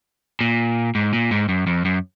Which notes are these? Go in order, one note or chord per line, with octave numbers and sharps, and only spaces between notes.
A#2
G#2
A#2
G#2
F#2
F2
F#2